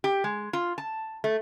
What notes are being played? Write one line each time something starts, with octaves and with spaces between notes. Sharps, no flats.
G4
G#3
F4
A5
A3